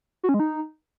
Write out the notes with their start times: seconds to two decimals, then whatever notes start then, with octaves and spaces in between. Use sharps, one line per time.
0.24 F#4
0.29 C#4
0.34 G#3
0.40 D#4